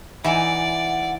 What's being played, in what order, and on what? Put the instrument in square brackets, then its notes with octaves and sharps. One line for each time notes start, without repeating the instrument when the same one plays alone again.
[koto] E3 D#4 [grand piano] E4 G#5 [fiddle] D5 [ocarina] F#5